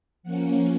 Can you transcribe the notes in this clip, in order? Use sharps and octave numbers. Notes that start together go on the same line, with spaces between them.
F3 A#3 C#4 F#5